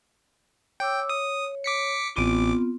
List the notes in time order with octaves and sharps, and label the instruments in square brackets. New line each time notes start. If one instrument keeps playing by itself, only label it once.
[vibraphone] C#5 D6 E6 [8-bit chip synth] G5
[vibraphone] C#5 [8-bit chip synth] D#6
[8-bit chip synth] D6 B6 C#7
[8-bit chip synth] A1 D6 [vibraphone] B3 C4 F4